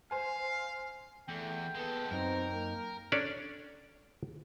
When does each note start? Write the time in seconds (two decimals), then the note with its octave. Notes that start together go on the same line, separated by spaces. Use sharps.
0.11 C5 F5 G#5
1.28 E2 A3 G5
1.75 G#3 B3 A4
2.11 F#2 C4 D#4 A#4
2.52 A#3
3.12 C#4 D4 A4 C#5 D5